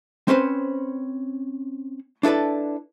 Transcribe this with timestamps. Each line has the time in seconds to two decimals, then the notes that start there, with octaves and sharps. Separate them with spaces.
0.28 C4 C#4 B4 C5
2.23 D4 E4 A4 B4 D5